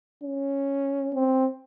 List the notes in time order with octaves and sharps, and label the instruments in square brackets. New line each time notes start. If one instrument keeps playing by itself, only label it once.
[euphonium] C#4
[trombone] C4